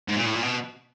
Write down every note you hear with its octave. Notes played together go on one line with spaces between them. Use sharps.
G#2
A#2
A2
A#2
B2